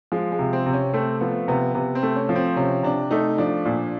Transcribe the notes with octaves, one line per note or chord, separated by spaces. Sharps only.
F3 G#3
G#3
C3
C4
C3
C#4
A3 C4
F3 B3
C3 B3
C3 B3
C4
A3
C#4
F3
C4
C3 C#4
C3 D4
A3 D#4
F3 D4
A#2